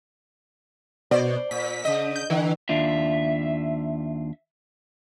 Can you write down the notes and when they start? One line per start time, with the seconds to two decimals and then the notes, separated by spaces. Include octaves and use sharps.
1.11 B2 C5 D5
1.51 A#2 B6
1.85 C#3 D#5
2.16 G6
2.30 D3 E3
2.69 D#2 D4 F4 E5